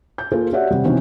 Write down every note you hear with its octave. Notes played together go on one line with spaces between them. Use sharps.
G6
A#3 F4 G#4 A4 C5
F#4 G4 C#5 D5 E5 F#5
C3 G3
B2 E3 C4 C#4 D#4 F#4